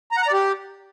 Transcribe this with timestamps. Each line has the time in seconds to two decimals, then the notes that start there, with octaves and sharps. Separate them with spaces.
0.11 A#5
0.17 F#5
0.22 A#5
0.27 D5
0.33 G4